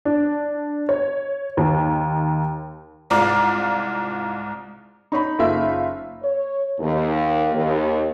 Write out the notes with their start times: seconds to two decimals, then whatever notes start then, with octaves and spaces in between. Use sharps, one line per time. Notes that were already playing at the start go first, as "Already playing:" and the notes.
0.05 D4
0.89 C#5
1.57 D#2
3.10 C2 G#2 F4 D5 A#5 D6
5.12 D#4 C#5 B5
5.39 F#1 F4 E5
6.23 C#5
6.80 D#2
7.55 D#2